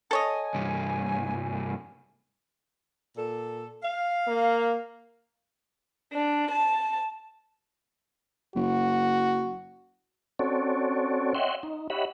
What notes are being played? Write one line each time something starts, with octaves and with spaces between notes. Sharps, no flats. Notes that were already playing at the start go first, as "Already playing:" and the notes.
A4 C#5 D#5 G#5
C2 G2
A#2 A4
F5
A#3
D4
A5
F#1 F#4
C4 C#4 F#4 A4 C#5 D5
C#5 D#5 E5 F#5 G5 C6
D#4
G4 C#5 D#5 E5 F#5 B5